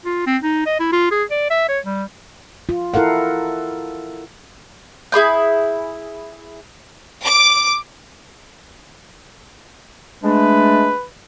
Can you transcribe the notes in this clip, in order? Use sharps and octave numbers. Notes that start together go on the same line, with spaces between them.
F4
C4
D#4
D#5
E4
F4
G#4
D5
E5
C#5
G3
F4
E4 A4 A#4 F5 F#5
E4 G#4 B5 G6
D6
G#3 A3 D4 B4